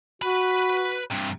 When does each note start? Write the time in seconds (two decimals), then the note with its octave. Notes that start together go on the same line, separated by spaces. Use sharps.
0.22 F#4 B4 B5
1.11 G2 C3